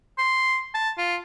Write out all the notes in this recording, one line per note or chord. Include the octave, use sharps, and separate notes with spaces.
C6
A5
F4